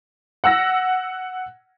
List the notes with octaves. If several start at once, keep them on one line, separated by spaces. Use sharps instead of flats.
F#5 E6 A#6